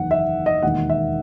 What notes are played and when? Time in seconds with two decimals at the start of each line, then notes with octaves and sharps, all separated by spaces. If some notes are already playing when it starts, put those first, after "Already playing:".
Already playing: F#1 E2 D#3 F#5
0.11 E5
0.46 D#5
0.63 E1 D#2 D#3 F#5
0.89 E5